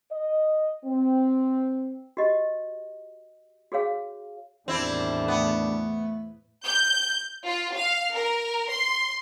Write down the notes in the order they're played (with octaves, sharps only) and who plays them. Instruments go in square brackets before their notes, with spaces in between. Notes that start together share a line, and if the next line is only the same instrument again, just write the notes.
[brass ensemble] D#5
C4
[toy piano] F#4 G4 D#5
F#4 G#4 C#5 F5
[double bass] E2 A2 [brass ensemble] D#3 G3 D4 [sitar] C4 E4
[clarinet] A3 [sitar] B3
[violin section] G6
F4
F5
A#4
C6